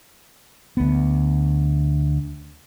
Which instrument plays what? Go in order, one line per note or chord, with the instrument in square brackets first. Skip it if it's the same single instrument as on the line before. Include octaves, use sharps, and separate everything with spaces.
[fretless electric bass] D2 B3